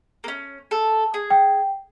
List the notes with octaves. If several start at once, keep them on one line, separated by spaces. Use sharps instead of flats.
A#3 C#4
A4
G#4
G5